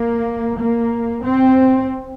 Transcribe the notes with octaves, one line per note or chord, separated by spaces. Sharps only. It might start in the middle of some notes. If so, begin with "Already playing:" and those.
Already playing: A#3
A#3
C4